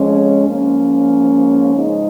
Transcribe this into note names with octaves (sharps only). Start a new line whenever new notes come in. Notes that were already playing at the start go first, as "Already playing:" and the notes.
Already playing: F2 F3 G#3 C#4
G#2 F3 A#3 C#4
C#3 F3 G#3 D#4